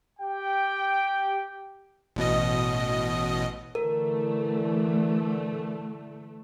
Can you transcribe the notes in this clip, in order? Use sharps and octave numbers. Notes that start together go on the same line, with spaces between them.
G4 G5
A1 B2 D#5
D3 E3 A3 A#4